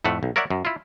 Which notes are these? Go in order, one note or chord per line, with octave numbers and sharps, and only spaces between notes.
F2 A2 A3 F#5
B1
A#4 C#5 D5 E5 F#5
F#2
E4 F4